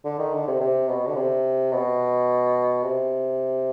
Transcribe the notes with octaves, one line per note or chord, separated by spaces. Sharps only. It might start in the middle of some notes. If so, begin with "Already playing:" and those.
D3
D#3
D3
C3
C3
B2
D3
C3
B2
C3